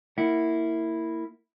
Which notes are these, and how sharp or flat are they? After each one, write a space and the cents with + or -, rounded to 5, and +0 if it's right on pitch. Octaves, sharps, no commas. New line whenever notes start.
A#3 -20 E4 -5 F#5 +0